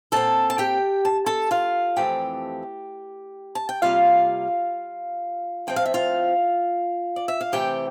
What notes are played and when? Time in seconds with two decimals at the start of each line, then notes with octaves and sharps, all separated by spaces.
0.12 A#2 F3 C4 A4 A5
0.50 A5
0.58 G4 G5
1.05 A5
1.26 A4 A5
1.51 F4 F5
1.97 F2 E3 A3 C4 G4 G5
3.55 A5
3.69 G5
3.82 C3 G3 A#3 F4 F5
5.67 A2 F3 C4 G5
5.76 F5
5.86 E5
5.94 F4 F5
7.16 D5
7.28 E5
7.41 F5
7.52 C3 E3 A3 C4 G4 G5